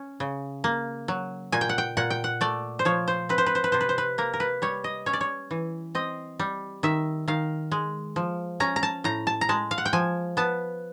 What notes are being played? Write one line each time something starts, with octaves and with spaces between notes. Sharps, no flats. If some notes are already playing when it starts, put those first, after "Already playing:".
Already playing: C#4
C#3
A#3
F#3
A#2 G#5
G5
F#5
G5
A#2 F#5
G5
F#5
A3 D5
C5
F3 C#5
C5
C4 B4
C5
B4
C5
B4
C3 C5
B4
C5
B4
A#3 A#4
A#4
B4
G3 C#5
D#5
C#4 C#5
D5
C#5
E3
C4 D#5
G3
D#3 E5
D#3 F5
G#3
F3
C#4 A#5
A#5
A5
A2 A#5
A5
A#5
G#3 A5
F5
F#5
G5
F3 G#5
B3 A5